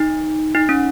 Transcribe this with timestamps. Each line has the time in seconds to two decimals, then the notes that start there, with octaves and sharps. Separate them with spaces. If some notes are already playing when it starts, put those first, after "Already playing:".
Already playing: D#4
0.55 D#4
0.69 C#4